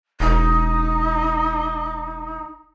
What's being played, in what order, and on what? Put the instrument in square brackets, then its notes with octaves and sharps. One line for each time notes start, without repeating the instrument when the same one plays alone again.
[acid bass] E1 [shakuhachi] D#4